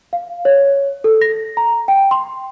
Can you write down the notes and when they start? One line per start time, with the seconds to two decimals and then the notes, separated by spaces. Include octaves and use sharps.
0.13 F5
0.45 C#5
1.04 A4
1.21 A#6
1.57 A#5
1.88 G5
2.11 C6